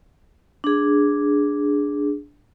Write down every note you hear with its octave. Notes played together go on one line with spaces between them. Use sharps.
D4 G#4